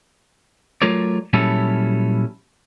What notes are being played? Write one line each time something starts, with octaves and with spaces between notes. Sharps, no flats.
F#3 A3 F4 A#4 C#5 D5
A#2 F#3 G3 C#4 E4 A4